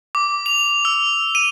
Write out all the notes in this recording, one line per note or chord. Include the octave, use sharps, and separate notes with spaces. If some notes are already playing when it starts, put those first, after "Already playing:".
D6
F7
E6
D#7